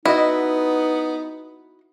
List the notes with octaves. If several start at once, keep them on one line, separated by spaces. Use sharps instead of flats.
B3 D#4 E4 F#4 D#5